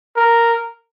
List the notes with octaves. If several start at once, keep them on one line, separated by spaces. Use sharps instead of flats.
A#4